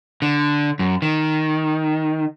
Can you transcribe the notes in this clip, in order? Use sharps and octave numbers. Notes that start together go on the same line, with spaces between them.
D3
F#2
D#3